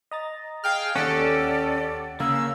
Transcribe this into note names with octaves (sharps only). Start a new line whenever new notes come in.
D#5 A#5 A6
G#4 F5 G5 F6
D#2 C#4 G4 A4 D5 F#5
C#3 A#3 E6